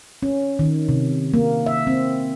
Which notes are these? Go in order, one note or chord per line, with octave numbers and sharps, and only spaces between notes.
C#4
D#3
C3
A#3
E5
C4